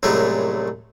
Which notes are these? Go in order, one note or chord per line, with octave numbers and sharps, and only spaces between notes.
C2 F#2 A2 G#3 A3